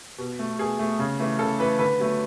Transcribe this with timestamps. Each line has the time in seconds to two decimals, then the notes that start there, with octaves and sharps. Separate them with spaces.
0.18 B2
0.39 A3
0.59 B2 G#4
0.79 A3
0.99 C#3
1.20 E3 A3
1.39 C#3 A4
1.59 E3 A3 B4
1.79 D3 B4
2.00 F#3 A3